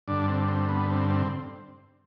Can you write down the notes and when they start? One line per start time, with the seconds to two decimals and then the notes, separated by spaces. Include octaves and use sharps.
0.08 G2 D3 D4
0.28 C4
0.48 C4
0.69 B3
0.90 C4
1.10 C4